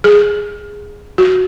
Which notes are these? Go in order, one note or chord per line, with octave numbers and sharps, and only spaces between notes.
G#4
F#4